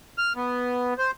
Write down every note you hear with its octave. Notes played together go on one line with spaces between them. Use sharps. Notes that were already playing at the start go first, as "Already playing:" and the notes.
F6
B3
C5